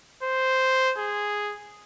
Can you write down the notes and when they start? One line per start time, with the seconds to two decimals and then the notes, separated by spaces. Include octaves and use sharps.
0.23 C5
0.98 G#4